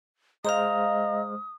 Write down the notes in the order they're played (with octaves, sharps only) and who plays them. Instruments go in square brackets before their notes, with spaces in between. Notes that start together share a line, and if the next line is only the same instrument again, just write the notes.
[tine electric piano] G#3 C5 F6 [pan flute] D#5 [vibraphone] F5 A#5 [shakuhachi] D#6